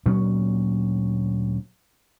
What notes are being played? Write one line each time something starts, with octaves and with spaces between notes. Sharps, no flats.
D2 A#2 F#3 C#4